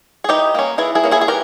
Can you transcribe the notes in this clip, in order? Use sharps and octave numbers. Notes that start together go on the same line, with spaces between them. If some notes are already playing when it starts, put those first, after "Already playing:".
G#4
E3 D#4 G4
A#3 C#4
E3 E4 G#4
E4 G#4
A#3 C#4
E4 G#4
G#4
E3 G4 A#4